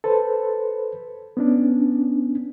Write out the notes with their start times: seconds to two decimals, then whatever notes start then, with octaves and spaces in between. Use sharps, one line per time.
0.04 A4 B4 C5
1.37 B3 C#4 D4